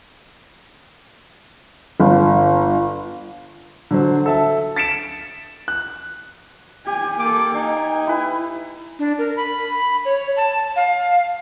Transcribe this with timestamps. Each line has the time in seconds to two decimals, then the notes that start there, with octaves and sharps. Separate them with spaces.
2.00 G1
3.91 D3 F#3 C5
4.26 A4 E5 A5
4.76 A6 B6 C#7 D7 E7
5.68 F#6
6.87 G4 G#5
7.20 A#3 A4 D6
7.54 D#4 G#5
8.07 E4 B4
8.99 D4
9.19 A#4
9.37 B5
10.05 C#5
10.37 A5
10.76 F5